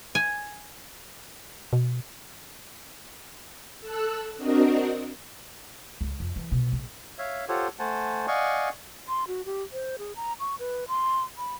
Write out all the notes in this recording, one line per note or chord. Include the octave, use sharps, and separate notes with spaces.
G#5
B2
A4 E6 F#6
C4 D4 F#4 A#4 D#5
C#2
F2
E3
B2
A#1
C#5 E5 F5
F4 G4 A4 C5 C#5 F#5
A3 C5 F#5 G#5 A5
D5 D#5 F5 F#5 G#5 C#6
C6
F#4
G4
C5
G#4
A#5
C#6
B4
C6
B5